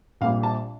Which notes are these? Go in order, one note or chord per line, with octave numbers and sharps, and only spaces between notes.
A#1 A#2 G3 F5
A5